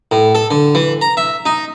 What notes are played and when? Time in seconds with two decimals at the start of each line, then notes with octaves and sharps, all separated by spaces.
0.11 A2
0.35 A4
0.51 D3
0.75 E3
1.01 A#5
1.17 E5
1.46 D#4